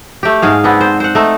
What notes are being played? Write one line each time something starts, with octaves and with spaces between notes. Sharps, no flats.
A3 G4
G#2 G#4 F5
B3 C4 D4
C5
C5 F#5
A3 D#4 A4